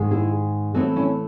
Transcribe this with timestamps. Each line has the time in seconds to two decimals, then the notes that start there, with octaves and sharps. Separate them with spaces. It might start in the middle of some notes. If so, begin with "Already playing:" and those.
Already playing: G#2 D#3 G#3
0.11 E4 G#4
0.74 A2 E3 A3 C4 D#4 F#4
0.96 C#4 E4